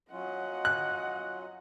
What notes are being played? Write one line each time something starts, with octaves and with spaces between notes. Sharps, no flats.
F#3 C#4 F4 D#5 F#5
F#6